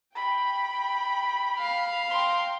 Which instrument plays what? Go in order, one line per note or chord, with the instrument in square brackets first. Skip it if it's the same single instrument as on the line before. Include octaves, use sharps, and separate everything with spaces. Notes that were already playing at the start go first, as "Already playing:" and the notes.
[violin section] G5 [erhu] B5
[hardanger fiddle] F5
[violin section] G5 A#5 C6